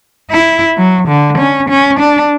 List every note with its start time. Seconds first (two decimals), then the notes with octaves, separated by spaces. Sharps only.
0.31 E4
0.77 F#3
1.08 D3
1.39 C#4
1.69 C#4
2.00 D4